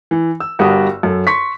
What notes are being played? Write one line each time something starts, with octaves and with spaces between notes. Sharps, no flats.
E3
E6
G1 G2 F#4 G4 A#4 D#6
F#2 A4
C6 C#6 B6